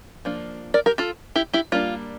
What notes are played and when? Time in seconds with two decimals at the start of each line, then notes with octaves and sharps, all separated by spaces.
0.25 F3 A#3 D4
0.74 A#4 D5
0.86 G4 A#4
0.98 F4 A4
1.36 E4 G4
1.53 E4 G4
1.72 G3 A#3 D4 F4